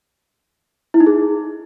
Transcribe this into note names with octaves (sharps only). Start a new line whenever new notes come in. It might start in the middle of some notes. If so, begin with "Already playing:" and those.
E4
D#4
G#4